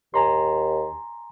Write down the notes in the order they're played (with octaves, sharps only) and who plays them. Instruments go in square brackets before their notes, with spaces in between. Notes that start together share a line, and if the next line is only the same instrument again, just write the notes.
[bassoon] D#2 [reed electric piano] G#5 A#5 C6